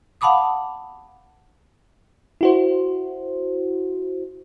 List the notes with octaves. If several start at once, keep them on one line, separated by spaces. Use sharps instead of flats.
F5 F#5 A5 B5 D6 D#6
E4 F#4 C5